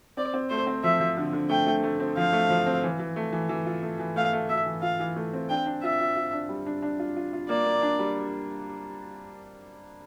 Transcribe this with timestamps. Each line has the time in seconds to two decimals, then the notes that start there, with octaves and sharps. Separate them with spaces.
0.17 C4 D5
0.34 C4
0.50 A3 C5
0.67 C4
0.83 F3 E5
1.00 F3
1.17 D3
1.33 D3
1.50 A3 G5
1.66 A3
1.83 A3
2.00 C4
2.17 F3 F5
2.33 A3
2.50 F3
2.66 C4
2.83 E3
2.99 E3
3.16 A3
3.33 E3
3.49 E3
3.66 F4
3.83 A3
3.99 E3
4.16 A3 F5
4.33 A3
4.49 A3 E5
4.66 E3
4.82 F4 F5
5.00 E3
5.16 A3
5.33 C4
5.50 D4 G5
5.66 D4
5.83 F4 E5
6.00 F4
6.16 F4
6.33 D4
6.49 G3
6.66 D4
6.82 D4
6.99 F4
7.16 F4
7.33 F4
7.49 A#3 D5
7.66 A#3
7.82 D4
7.99 G3